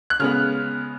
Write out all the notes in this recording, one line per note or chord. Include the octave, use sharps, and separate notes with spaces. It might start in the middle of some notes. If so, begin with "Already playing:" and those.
F#6
C#3 G#3 B3 F6